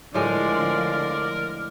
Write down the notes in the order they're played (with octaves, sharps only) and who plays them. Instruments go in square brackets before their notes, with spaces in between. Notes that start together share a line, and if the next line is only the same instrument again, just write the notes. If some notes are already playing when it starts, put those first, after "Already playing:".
[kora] A2 G#3 [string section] D3 F3 [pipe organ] A#4 [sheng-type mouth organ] D5